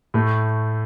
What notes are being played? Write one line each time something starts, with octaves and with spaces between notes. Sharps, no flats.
A2 A3